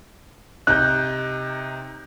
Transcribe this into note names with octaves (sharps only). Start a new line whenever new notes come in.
C3 D#4 F#6 G6